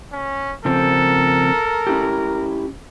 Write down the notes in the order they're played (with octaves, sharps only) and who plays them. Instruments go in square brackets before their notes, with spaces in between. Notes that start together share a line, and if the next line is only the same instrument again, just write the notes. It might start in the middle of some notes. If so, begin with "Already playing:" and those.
[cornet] C#4
[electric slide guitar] C#3 F3 C4 [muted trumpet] A4 [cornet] A#4
[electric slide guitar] C#4 E4 G4